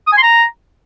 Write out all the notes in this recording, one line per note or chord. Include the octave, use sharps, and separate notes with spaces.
D#6
G#5
C6
A#5